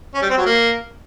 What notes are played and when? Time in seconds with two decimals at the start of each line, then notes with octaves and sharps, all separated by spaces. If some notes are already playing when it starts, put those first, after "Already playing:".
0.14 C#4
0.22 G3
0.30 C4
0.38 F#3
0.45 A#3